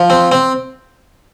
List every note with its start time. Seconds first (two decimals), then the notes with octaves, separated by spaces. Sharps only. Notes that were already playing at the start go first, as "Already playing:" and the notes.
Already playing: F3
0.10 C4
0.32 C4